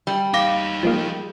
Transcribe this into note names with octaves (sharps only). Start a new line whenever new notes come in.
G3
D#4 G4 F5 D6 A#6
F3 G#3 A#3